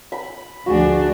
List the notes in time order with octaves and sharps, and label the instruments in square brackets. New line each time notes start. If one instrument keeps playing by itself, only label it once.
[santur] B5
[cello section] D2 F3 D4 [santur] F#4 G#4